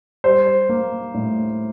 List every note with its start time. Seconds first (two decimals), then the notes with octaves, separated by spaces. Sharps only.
0.24 G3 C5
0.69 A#3
1.14 A2